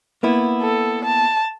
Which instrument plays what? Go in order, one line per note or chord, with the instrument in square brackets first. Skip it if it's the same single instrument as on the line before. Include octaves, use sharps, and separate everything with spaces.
[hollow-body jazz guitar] A#3 B3 E4
[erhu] A4
A5